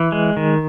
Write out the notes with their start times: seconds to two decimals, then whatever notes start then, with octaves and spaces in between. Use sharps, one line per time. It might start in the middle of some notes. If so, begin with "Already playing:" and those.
Already playing: E3
0.12 G#3
0.37 D#3